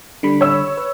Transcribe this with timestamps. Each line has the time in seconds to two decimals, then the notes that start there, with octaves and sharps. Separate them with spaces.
0.23 D3 G3 B5
0.41 C#5 E6
0.77 B4